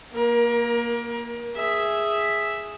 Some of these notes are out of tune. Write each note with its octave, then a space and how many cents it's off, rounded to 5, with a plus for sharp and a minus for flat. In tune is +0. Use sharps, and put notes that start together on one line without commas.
A#3 +10 A#4 +30
G#4 +0 E5 +0